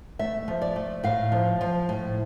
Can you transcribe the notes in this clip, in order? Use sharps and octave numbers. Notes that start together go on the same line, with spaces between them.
A3 E5
F3
D5
A3
A2 F5
F3
F3
A2